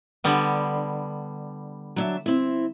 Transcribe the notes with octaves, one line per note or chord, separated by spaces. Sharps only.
D3 G3 B3
F#3 D4 E5
C4 E4